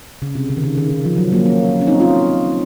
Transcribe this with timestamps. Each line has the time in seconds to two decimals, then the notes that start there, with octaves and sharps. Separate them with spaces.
0.22 C#3
0.35 C3
0.50 C#3
0.57 D#3
0.63 C#3
0.78 D#3
0.90 D#3
1.05 F3
1.18 F#3
1.32 F#3 A#3
1.46 A#3 C#4
1.81 C#4
1.87 C4 D#4
2.01 C#4 F4